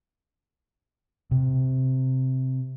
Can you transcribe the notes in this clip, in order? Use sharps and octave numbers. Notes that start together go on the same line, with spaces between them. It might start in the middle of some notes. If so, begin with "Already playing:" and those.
C3